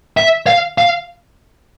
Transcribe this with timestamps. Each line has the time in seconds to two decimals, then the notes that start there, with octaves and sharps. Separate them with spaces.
0.17 E5
0.47 F5
0.78 F5